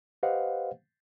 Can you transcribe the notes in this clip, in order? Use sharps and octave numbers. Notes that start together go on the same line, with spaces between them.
G4 B4 C5 D#5 F5 F#5